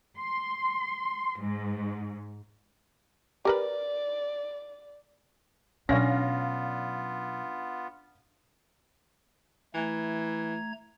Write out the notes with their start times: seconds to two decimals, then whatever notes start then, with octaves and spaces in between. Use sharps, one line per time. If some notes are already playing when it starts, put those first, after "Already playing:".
0.18 C6
1.39 G#2
3.45 G4 A#4 B4 D5
5.89 B2 F#3 B3 C#4 D4 F4 F5 A#6
9.75 E3 A3 A#5 G#6